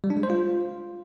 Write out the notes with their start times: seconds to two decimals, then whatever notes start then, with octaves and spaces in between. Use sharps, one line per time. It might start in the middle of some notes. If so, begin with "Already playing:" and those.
0.04 G3
0.10 D4
0.17 G#3
0.23 C5
0.30 F4